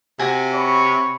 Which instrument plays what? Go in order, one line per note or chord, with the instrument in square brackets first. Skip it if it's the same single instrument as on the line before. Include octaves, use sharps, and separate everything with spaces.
[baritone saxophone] C3 [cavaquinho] F#4 G#5
[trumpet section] C#5 B5 C#6